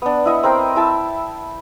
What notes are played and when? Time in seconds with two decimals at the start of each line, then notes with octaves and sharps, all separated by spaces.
0.02 B3 D4
0.25 E4 D#5 E5 F#5
0.43 C4 A#4 C5 G5
0.76 E4 E5 A5 B5